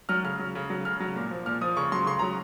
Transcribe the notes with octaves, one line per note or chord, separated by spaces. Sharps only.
F#3 F6
C#3 F6
F#3
C#3
F#3
C#3 F6
F#3
A#2
F3
A#2 F6
F3 D#6
C#3 C#6
F#3 C6
C#3 C6
F#3 A#5